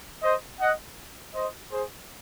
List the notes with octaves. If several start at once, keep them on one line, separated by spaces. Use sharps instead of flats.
C5 D#5
D#5 F#5
C5 D#5
G#4 C5